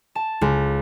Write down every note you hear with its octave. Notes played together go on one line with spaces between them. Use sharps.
A5
C#2